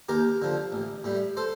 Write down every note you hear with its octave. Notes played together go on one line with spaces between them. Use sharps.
D#2 G4 A#4
D3 F3
A1
A2 G3
A4 C5